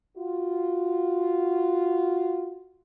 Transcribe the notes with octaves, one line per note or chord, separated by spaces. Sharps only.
F4 F#4